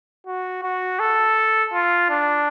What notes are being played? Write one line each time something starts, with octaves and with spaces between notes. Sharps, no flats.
F#4
F#4
A4
F4
D4